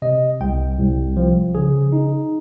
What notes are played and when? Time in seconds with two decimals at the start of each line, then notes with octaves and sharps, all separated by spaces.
0.02 C3 D#5
0.41 C2 G5
0.78 C2
1.17 F3
1.55 C#3 G#4
1.92 D#4